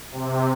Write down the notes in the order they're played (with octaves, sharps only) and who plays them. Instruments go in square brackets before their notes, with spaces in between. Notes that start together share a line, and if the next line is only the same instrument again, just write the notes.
[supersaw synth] C3